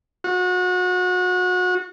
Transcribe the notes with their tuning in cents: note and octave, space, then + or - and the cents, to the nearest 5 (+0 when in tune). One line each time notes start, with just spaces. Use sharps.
F#4 -30